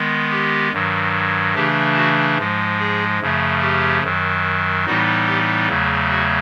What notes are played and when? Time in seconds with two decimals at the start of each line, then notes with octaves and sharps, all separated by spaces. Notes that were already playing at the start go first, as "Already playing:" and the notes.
Already playing: D#3 G#3 B3
0.31 G4
0.72 G2 D#3 F#3
1.55 C#3 E3 A3 D4 G4
1.96 F#4
2.37 G#2 F3 G#3
2.79 G#4
3.20 F#2 C#3 F3 A3
3.62 G4
4.03 F#2 D#3 F#3
4.86 A2 E3 G3 B3 D#4 F#4
5.27 G4
5.68 E2 C#3 F#3 A3
6.10 F#4